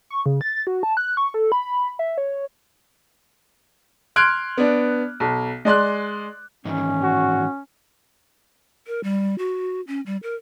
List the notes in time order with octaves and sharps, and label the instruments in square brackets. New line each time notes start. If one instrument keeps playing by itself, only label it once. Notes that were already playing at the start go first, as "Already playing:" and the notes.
[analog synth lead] C#6
C#3
A6
F#4
A5
F#6
C#6
A4
B5
E5
C#5
[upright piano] C6 F6 F#6 G#6 D7
B3 D4
B1
G#3 D5 C6 F#6
[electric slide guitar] G#2 D#3 E3 [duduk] C#4
[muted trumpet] F#4
[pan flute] A#4
G3
F#4
C#4
G3
A#4